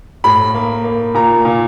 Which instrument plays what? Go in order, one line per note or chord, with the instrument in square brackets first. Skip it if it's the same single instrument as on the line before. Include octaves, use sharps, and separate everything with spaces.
[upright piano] A2 B5
A#3
A#3
A#2 A#5
A#2